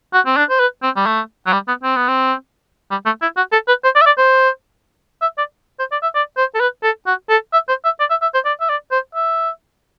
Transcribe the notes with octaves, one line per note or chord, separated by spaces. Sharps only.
F#4
C4
D4
C5
B4
C4
G3
A3
F#3
G3
B3
C4
B3
C4
G3
A3
E4
F#4
A4
B4
C5
D5
E5
D5
C5
E5
D5
C5
D5
E5
D5
C5
A4
B4
A4
F#4
A4
E5
C5
E5
D5
E5
E5
C5
D5
E5
D5
C5
E5